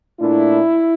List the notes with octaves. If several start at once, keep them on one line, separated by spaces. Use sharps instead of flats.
A#2 A3 D4 E4